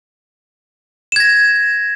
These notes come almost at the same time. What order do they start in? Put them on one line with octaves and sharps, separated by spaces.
E7 G#6 A#6